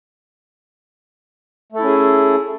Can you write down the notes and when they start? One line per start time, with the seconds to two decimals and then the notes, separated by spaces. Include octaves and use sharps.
1.72 A3
1.76 A4
1.79 E4
1.83 C#4
1.87 G#4